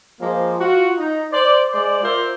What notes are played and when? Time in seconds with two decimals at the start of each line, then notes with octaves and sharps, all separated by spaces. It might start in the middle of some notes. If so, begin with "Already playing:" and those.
0.20 F3 G#3 A#3
0.60 F4 F#4
0.98 D#4
1.32 C5 D5
1.73 G#3 C5 D5
2.03 F4 A#4 C5 D5 E5